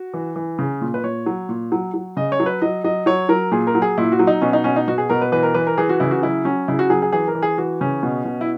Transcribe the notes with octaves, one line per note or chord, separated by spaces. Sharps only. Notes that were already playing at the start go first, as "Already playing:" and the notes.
Already playing: F#4
E3
E3
C#3
A#2
B4
A#2 C#5
F#3
A#2
F#3
F#3
C#3 D#5
C#5
F#3
B4
F#3 D#5
F#3 D#5
F#3 C#5
F#3 A#4
A#2 G#4
A#4
F#3
G#4
A#2 E4
F#4
F#3
D#4
B2 C#4
D#4
B2 C#4
D#4
B2 F#4
G#4
B2 A#4
B4
E3 B4
A#4
E3 B4
A#4
E3 G#4
F#4
C#3 E4
F#4
F#3 E4
F#3 C#4
C#3 E4
F#4
F#3 G#4
G#4
E3 G#4
A#4
E3
G#4
E3 F#4
C#3 C#4
B2
B2
E4